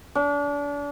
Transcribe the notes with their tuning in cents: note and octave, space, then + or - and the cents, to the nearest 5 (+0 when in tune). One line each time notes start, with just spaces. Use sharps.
D4 -35